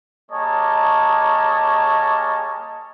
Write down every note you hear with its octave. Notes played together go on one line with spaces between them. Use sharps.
G3 A#3 G#4 C#5 D#5 A5